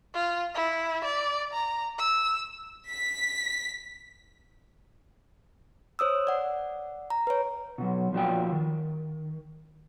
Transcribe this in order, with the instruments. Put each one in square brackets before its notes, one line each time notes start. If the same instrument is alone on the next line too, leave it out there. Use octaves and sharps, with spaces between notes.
[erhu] F4
E4
D5
A#5
E6
[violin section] B6
[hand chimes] C5 C#5 D#6 E6
D5 F#5
A#5
B4 C#5
[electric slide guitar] B2 F#3
A#2 F3 F#4 G5
D#3